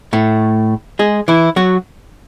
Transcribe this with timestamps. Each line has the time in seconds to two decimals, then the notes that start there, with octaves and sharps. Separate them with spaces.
0.13 A2 A3
0.99 G#3 G#4
1.28 E3 E4
1.56 F#3 F#4